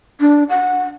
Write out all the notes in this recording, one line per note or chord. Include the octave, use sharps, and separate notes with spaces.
D4
F#5